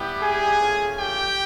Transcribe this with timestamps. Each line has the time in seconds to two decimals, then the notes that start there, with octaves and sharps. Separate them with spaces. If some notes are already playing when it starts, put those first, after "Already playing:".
Already playing: G3 B3 E4 G4
0.21 G#4 G#5
0.60 A3 C#4 F4
0.98 G4 G5